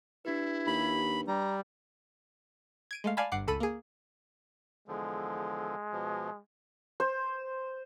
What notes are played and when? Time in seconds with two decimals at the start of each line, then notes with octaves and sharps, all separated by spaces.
0.25 D4 E4 G4 B4
0.67 D#2 B5
1.28 G3 A#5
2.91 G#6 D7 D#7
3.04 G#3 A3 F5
3.17 D5 F5 G#5 A5 B5
3.32 G1 G2 F#5 D6 C7
3.47 C#2 A4 B5 D#7
3.60 A#3 G#4
4.88 E2 D3 F3 G#3
5.92 B2 F3
7.00 C5